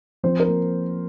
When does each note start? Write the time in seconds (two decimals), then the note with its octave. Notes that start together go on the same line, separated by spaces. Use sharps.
0.23 F3 C4 C5
0.40 A#4
0.48 A#3